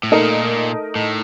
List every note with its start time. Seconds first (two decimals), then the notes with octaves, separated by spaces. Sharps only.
0.03 A2
0.12 A#2 A3 D#4 A#4 D#5
0.95 A2